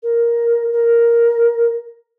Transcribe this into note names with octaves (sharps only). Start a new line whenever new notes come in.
A#4
A#4